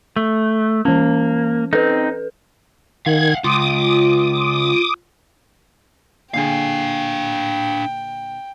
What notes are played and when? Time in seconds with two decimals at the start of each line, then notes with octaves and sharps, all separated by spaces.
0.16 A3
0.85 E3 A#3 C#4
1.73 C4 D#4 A4 B4
3.06 D#3 F5 F#5 G#6
3.44 C#2 F4 D6 D#6
6.34 A#2 D3 D4 G#4 F5 G5